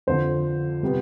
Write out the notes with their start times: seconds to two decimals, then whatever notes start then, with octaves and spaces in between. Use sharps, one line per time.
0.07 F2 D3 F3 C5
0.83 C3 G3 B3